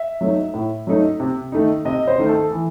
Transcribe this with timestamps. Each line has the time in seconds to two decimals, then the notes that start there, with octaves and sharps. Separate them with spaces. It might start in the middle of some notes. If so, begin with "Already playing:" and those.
Already playing: E5
0.21 F#3 A3 D#4
0.54 A2
0.87 F#3 A3 D#4
1.20 C3
1.52 D#3 A3 D#4
1.85 C3 D#5
2.07 C5
2.18 D#3 A3 D#4
2.29 A4
2.51 E3